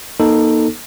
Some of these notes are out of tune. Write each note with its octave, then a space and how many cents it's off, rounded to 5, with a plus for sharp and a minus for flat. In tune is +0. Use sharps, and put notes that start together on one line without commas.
A#3 +35 D#4 +0 A4 +10